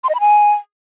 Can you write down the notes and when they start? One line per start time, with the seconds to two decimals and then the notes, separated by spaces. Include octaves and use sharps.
0.04 C6
0.09 D#5
0.15 B5
0.20 G#5